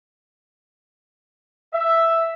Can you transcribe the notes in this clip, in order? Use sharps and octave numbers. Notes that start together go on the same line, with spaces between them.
E5